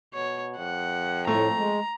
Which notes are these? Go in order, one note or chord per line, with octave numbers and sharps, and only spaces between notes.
B2 C#5
F2 F#5
A2 A3 A#5
G#3